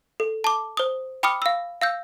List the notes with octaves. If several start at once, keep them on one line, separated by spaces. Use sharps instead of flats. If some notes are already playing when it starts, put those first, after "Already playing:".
A4
A5 D6
C5 D#6
G5 B5 D6 D#6 F6 C#7
F5 E6
F5 E6 G6